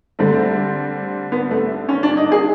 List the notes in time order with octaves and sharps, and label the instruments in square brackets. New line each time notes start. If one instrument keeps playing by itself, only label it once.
[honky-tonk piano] D3 G3 C4 [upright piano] A3
[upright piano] B3
A3
C#4
D4
D#4
G#4